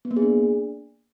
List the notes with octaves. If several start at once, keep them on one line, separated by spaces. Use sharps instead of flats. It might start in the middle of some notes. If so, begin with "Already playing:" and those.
B3
A#3
G#4
D4